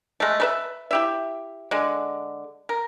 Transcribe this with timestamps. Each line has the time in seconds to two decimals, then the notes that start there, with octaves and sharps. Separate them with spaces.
0.20 G#3 A3
0.40 A3 B4 E5
0.91 E4 G4 E5
1.71 D3 G#3
2.69 A#4